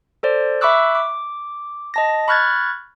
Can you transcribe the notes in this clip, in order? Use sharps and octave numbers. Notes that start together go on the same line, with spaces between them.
A4 C5 D5
E5 B5 C#6 D6 E6 F#6
D6
D#5 A5 A#6
B5 C#6 F6 F#6 G#6 A6